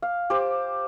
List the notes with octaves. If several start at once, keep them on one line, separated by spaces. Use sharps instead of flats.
F5
G4 C5